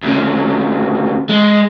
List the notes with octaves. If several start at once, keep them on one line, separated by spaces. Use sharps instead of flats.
D2 C#3
G#3